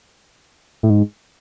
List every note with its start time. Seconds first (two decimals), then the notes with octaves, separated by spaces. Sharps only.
0.83 A2
0.90 G#2